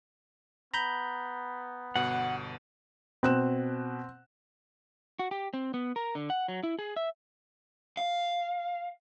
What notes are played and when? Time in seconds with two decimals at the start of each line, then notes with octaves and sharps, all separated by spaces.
0.74 B3 A#5 B5 G6
1.96 G1 B2 F#5
3.23 B2 C4 F#6 E7
5.19 F#4
5.31 G4
5.54 C4
5.74 B3
5.96 A#4
6.15 D3
6.30 F#5
6.48 F#3
6.63 E4
6.79 G#4
6.96 E5
7.97 F5